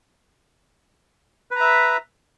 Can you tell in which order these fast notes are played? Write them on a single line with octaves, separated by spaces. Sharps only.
B4 A#5 E5